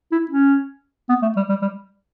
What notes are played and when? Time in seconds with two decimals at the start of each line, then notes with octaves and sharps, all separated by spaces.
0.12 E4
0.31 C#4
1.09 B3
1.22 A3
1.36 G3
1.49 G3
1.62 G3